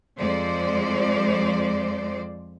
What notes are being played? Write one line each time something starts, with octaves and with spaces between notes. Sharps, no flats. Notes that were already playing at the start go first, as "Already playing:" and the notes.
F2 G#3 C5 D5